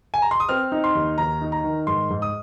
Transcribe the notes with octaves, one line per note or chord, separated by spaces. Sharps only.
G#5
A#5
C6
D#6
C4 F6
D#4
C6
D#2
D#2 A#5
D#4
A#5
D#3
G#2 C6
G#2
D#6